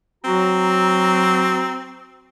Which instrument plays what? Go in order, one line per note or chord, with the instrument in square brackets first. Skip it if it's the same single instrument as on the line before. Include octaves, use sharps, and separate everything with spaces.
[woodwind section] F#3 F#4 A#5 [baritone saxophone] C4